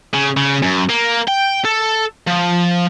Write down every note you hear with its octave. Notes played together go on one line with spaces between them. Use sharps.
C#3
C#3
F#2
A#3
G5
A4
F3